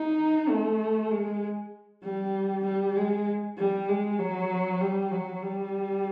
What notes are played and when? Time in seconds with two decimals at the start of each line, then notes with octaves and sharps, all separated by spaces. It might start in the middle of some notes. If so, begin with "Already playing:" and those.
Already playing: D#4
0.49 A3
1.11 G#3
2.04 G3
2.65 G3
2.96 G#3
3.58 G3
3.89 G#3
4.19 F#3
4.81 G3
5.11 F#3
5.43 G3